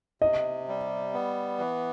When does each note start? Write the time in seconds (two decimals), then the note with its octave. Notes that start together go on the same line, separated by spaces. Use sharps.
0.22 C3 D#5
0.68 G3
1.14 B3
1.59 E3